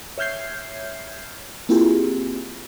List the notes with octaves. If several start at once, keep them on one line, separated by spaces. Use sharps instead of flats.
C#5 E5 F6 G6 G#6 C7
A#3 C4 E4 F4 G4 G#4